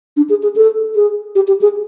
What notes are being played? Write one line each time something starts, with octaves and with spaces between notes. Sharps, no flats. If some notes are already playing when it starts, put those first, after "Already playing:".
D4
G#4
G#4
A4
G#4
G4
G4
G#4